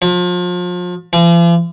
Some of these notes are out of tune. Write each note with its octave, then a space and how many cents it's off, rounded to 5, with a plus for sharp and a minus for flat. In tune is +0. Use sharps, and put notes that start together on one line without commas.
F3 +35
F3 -45